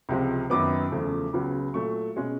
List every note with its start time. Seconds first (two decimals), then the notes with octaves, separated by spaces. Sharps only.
0.09 C#2 C3 F3 G#3
0.50 F#2 D#3 F#3 B3 D6
0.92 E2 C#3 F3 A3
1.33 C#2 C#3 F#3 B3
1.74 A#2 F#3 A3 C#6
2.16 B2 G#3 C#4